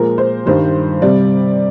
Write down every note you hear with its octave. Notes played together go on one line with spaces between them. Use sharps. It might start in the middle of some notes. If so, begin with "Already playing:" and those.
Already playing: A#2 F3 G#3 A#4
C5
G2 D#3 G3 C5
C3 G3 D5